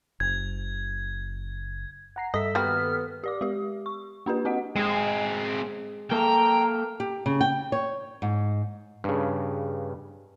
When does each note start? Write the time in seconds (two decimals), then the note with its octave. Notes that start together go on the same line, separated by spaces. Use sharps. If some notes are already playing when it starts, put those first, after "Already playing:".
0.20 F#1 G#6
2.16 F#5 A#5 C7
2.34 G2 A4 D#5 E5 B6
2.55 D#3 G3 A#3 B3 F#4 B4 F6
3.24 G4 D5 D6
3.41 G#3 G4
3.86 C#6
4.26 A#3 D4 G4 B4
4.45 C4 F#4 D#5 F#5
4.76 G#3 C4 G#4
6.12 A#3 A4 G5 A#5
7.00 G4
7.26 C#3
7.41 G5
7.72 C#5
8.22 G#2
9.04 G2 C#3